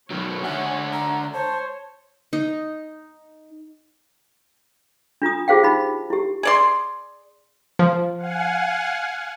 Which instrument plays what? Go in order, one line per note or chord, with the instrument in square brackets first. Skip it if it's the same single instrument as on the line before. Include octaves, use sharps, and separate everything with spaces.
[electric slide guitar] B2 D#3 F#3 [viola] C#5
[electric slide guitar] D3 E5 F#5 [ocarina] G#5
[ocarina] A#5
[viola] C5 C#5 [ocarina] A5
[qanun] D#4
[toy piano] D4 F4 A#5 D#6
F4 G4 G#4 C5 F5 G5
D#4 B5
E4 G4
[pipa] G#4 D5 C6
[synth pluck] F3
[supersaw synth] F5 F#5 G#5